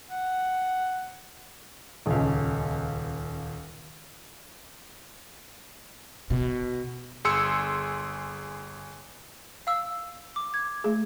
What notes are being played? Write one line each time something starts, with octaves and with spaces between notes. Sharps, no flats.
F#5
D#1 C#2
B2
G1 G#4 C6 E6 C#7
F5 E6
D6
G#6
A3 G#4